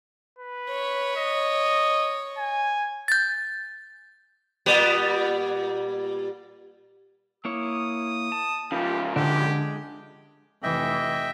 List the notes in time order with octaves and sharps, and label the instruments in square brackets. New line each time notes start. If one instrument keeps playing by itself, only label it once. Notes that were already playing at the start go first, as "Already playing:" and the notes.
[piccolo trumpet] B4
[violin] C#5
[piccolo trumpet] D#5
G#5
[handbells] G6 A6
[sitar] A#2 G3 B3
[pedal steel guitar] A#3 E4 C#5 [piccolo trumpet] D#6
[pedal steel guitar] A5
[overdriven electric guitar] C#3 F3 [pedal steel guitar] F4 [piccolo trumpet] G4
[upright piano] D3 [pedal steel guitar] G#3 D4 [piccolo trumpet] G4
[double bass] F1 E3 [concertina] D#5 E5 G5